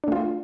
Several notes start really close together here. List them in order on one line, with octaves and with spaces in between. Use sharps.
D4 A3 F4